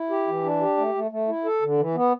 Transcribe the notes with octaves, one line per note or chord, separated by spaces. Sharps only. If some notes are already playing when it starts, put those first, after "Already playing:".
Already playing: E4
G4
E3
D4
G4
A3
A3
A3
E4
A4
D3
E3
B3